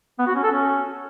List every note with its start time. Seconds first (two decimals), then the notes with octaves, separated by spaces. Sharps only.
0.19 B3
0.27 F#4
0.35 C#4
0.43 A4
0.52 C#4